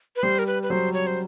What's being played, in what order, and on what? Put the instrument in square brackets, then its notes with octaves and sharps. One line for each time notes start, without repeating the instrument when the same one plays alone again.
[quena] B4
[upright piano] G3 [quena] C5
[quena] A#4
B4
B4
[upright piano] F#3 [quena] C5
[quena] C#5
C5